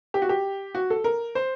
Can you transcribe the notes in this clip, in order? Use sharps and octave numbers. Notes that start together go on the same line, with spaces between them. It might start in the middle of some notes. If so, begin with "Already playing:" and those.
G4
F#4
G4
F#4
A4
A#4
C5